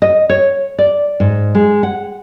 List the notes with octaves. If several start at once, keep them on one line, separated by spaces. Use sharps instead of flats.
D#5
C#5
D5
G#2
G#3
F#5